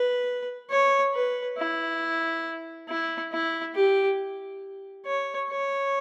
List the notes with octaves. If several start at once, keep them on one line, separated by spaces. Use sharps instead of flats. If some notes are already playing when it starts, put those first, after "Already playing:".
Already playing: B4
C#5
B4
E4
E4
E4
G4
C#5
C#5